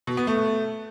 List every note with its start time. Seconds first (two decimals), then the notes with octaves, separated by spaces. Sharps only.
0.07 B2
0.17 B3
0.27 A3